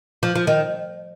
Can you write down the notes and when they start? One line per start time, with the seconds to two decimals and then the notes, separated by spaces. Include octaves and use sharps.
0.23 F3
0.35 F3
0.47 D#3